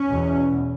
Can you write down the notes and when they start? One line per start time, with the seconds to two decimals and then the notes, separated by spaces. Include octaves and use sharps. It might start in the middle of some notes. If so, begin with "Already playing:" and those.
Already playing: C#4
0.08 E2 B2